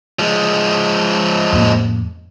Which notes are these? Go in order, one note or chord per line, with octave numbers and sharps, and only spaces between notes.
F3 G#3
F2 A2 A#3